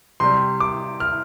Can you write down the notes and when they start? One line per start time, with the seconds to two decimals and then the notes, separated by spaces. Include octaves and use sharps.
0.20 C3 G3 C6
0.60 D6
1.00 F6